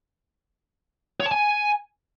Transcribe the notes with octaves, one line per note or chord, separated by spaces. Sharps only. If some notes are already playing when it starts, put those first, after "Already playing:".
C#5
A5
G#5